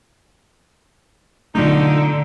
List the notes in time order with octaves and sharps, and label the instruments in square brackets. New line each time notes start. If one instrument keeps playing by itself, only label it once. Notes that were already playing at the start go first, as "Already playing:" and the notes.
[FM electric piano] B2 F#3 G6 [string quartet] D3 [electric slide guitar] A3 D4 F4 [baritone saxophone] D#4